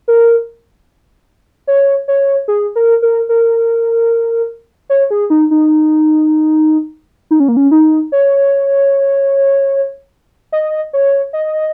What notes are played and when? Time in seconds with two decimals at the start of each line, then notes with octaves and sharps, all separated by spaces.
0.08 A#4
1.67 C#5
2.08 C#5
2.48 G#4
2.76 A#4
3.02 A#4
3.29 A#4
4.90 C#5
5.11 G#4
5.30 D#4
5.51 D#4
7.31 D#4
7.40 C#4
7.48 A#3
7.57 C#4
7.71 D#4
8.12 C#5
10.52 D#5
10.93 C#5
11.33 D#5